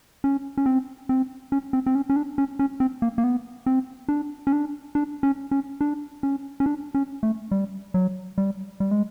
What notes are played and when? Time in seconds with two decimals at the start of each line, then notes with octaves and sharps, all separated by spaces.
0.24 C#4
0.58 C#4
0.66 C4
1.09 C4
1.52 C#4
1.73 C4
1.86 C4
1.95 C#4
2.10 C#4
2.16 D4
2.38 C#4
2.59 C#4
2.80 C4
3.02 A#3
3.18 A#3
3.24 B3
3.66 C4
4.09 D4
4.47 C#4
4.52 D4
4.95 D4
5.23 C#4
5.51 C#4
5.81 D4
6.23 C#4
6.60 C#4
6.66 D4
6.95 C#4
7.23 A3
7.51 G3
7.94 F#3
8.38 G3
8.80 G3
8.91 G#3